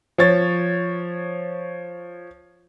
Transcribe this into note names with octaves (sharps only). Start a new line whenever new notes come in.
F3 C#5 A6